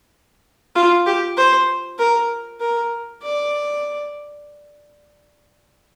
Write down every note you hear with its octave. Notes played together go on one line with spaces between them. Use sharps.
F4
G4
C5
A#4
A#4
D5